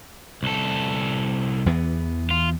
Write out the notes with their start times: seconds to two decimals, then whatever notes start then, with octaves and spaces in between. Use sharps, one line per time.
0.43 C2 A4
1.66 E2 E3 B3
2.31 F4